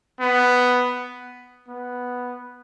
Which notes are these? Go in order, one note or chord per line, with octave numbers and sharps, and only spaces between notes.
B3
B3